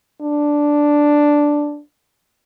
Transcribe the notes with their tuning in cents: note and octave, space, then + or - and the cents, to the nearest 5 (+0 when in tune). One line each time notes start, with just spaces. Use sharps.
D4 +0